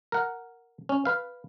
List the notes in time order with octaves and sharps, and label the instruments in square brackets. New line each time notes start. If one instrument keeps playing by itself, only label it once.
[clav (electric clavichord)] A#4 F#5
C#4
B4 F5